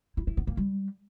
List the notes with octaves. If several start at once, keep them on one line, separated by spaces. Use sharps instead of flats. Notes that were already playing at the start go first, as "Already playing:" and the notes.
E4
E4
B3
A#3
G3